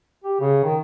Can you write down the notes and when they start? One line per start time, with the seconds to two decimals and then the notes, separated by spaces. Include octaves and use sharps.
0.24 G4
0.41 C#3
0.64 D#3